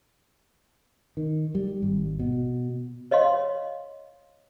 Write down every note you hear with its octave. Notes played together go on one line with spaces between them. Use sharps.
D#3
G3
G#1
B2
C#5 D#5 F5 C6